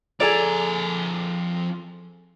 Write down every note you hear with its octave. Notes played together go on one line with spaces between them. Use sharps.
F2 G#4 A4 D5 A#5